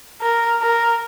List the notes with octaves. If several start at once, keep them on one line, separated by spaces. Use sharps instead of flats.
A#4
A#4